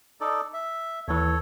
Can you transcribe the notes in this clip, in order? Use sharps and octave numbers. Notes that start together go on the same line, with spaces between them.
D#4 A4 D5
E5
D#2 E3 A4 C#5